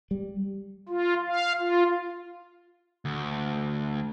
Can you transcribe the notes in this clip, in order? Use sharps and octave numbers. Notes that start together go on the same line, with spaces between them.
G3
F4
F5
F4
D2